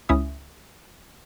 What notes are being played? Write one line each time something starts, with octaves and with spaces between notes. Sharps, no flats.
C#2 C#4 E4 E5 D#6